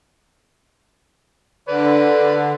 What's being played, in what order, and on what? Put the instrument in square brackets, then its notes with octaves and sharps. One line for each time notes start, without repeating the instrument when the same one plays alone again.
[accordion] D3 [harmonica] B4 D5